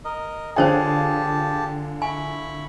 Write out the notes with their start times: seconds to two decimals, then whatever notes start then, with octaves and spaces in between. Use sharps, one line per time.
0.05 A#4 D#5
0.56 D3 F4 G4 G#4 C5 C#5 G5 A5
2.02 E4 G#5 B5 C#6